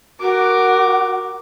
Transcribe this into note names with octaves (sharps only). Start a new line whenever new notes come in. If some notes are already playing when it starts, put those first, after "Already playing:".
F#4 A#4 D6